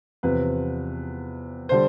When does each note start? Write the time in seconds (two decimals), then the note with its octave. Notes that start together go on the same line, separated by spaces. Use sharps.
0.23 E2 C3 F3 B4
1.69 D3 G3 C5